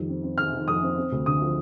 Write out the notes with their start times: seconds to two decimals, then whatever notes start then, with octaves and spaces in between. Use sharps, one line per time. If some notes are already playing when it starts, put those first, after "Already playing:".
Already playing: F2 D#3 G3
0.09 C4
0.24 C4
0.38 D#3 F6
0.53 D#3
0.68 F2 D#6
0.83 C4
0.98 C4
1.12 D2
1.26 D3 D#6
1.42 F3